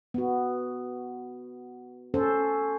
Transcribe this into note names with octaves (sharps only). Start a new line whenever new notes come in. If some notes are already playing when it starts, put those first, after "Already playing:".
B3 F#4
C#4 A4 C5